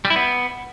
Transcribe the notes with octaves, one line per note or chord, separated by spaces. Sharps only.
G3
E4
B3